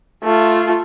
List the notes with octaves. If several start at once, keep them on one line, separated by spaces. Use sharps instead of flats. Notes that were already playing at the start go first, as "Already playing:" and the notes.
A3 F4